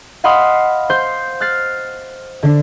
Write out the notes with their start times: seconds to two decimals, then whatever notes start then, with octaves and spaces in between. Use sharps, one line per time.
0.24 D#5 F5 F#5 B5 C6 D#6
0.90 C5 C6 G6
1.40 F6 F#6 A6 C7
2.43 D3 D4